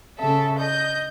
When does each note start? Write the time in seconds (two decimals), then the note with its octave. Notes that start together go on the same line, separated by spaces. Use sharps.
0.19 C#3 A4 E5
0.59 D#5 G6